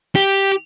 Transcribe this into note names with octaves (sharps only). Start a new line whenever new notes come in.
G4